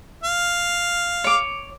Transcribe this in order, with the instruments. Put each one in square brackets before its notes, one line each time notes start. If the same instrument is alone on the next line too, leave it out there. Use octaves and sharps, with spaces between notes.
[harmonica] F5
[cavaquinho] C#5 D6